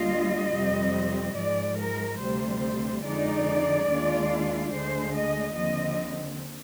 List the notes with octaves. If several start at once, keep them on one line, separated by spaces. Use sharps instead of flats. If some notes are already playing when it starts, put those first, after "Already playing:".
Already playing: D2 D3 G3 A#3 F4 D#5
F2 C3 G3 C4
G#2 F3 G#3 D5
A#4
D2 C3 G3 C5
F2 D3 G#3 D#4 D5
D#2 D#3 G#3 D4 F4
D2 D3 G#3 C5
D#5
D#2 D3 F3 C4 D#5